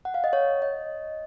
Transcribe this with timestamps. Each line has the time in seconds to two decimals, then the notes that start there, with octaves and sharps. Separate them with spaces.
0.05 F#5
0.14 F5
0.24 D#5
0.33 C#5
0.62 D#5